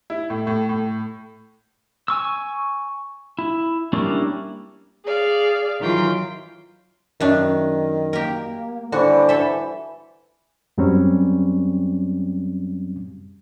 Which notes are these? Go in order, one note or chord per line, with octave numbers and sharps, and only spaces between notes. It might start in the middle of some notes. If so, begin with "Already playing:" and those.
E4
A2
A2
A2
G#5 C#6 E6
E4
G3 A#3 C#4 D4 E4
G#4 D5 F5
D#3 E3 F#3 F4 G5 C6
F#2 D#3 D4
A#3 G4 A#4
D3 E3 G3 F#4 C5
A4 E5 G#5
F#2 F#3 G3 C4 C#4